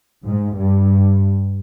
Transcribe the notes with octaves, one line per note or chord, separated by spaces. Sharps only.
G#2
G2